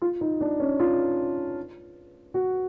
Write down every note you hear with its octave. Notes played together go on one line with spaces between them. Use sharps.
F4
D#4
D4
C#4
F4
F#4